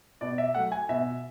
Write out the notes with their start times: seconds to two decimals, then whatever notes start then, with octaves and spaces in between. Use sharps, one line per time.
0.21 B2 D5
0.38 E5
0.55 F#3 A3 F#5
0.72 G#5
0.89 B2 E5